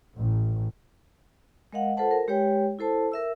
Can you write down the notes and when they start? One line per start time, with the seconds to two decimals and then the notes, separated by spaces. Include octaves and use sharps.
0.17 A1
1.73 G#3 A#4 D#5 F5 F#5
1.97 F4 A4 B4 C5 F#5 A5
2.11 A#4
2.28 G#3 G4 B4 C#5 G5
2.79 E4 A4 C5 A5
3.12 A#4 E5 E6